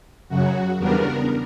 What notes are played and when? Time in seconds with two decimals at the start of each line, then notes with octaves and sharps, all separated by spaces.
0.29 F#2 C#3 F#3 F#4
0.78 E2 C#3 G3 B3 D4 A#4